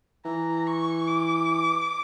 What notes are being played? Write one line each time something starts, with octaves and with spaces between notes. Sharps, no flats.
E3 A#5
C#6
D6